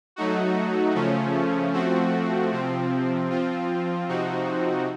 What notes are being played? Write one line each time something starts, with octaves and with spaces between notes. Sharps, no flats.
F#3 A3 D#4 F#4
C#3 F3 A3 C#4
F3 A3 C4 F#4
C3 F3 C4
F3 C4 F4
C3 F3 C4 D#4 F#4